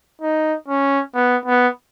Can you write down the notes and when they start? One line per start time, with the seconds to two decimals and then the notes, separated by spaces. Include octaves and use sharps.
0.21 D#4
0.68 C#4
1.15 B3
1.46 B3